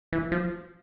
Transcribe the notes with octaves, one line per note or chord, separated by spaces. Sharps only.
E3
F3